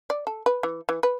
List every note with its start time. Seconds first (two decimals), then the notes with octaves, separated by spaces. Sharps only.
0.10 D5
0.27 A4
0.46 B4
0.63 E3
0.89 E3
1.03 B4